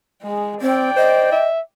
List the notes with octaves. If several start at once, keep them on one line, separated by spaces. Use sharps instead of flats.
G#3 G#4
C4 D5 G5
C5 D#5
E5